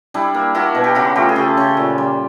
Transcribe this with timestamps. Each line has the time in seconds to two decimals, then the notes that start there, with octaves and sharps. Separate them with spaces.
0.14 G3 D4 E4
0.34 A#3
0.55 A#3 E4 F#4
0.75 B2
0.84 G4
0.95 C#3 E4 F#4
1.16 A3 F4 G4
1.29 G#4
1.36 C#3 G4 A4
1.57 C#3
1.77 A#2
1.98 G3